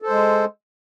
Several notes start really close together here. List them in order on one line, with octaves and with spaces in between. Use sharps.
A4 C5 G#3